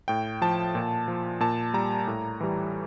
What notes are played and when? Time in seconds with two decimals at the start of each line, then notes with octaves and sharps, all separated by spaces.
0.08 A2 G5
0.42 F3 A5
0.75 A#2
1.08 F3
1.40 A#2 A5
1.74 G3 A#5
2.07 A2
2.40 E3 G3